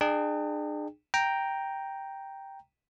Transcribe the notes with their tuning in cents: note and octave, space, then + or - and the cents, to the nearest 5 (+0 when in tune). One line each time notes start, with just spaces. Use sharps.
D4 +40 G#4 +0 G5 +15
G5 +0 A#5 +0